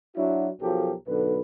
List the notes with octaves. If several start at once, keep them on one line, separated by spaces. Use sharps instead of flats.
F#3 D4 E4 F#4
B1 F3 F#3 G4 A4 A#4
B1 D3 B4